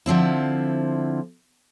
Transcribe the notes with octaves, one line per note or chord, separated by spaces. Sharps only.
D3 F3 C4 E4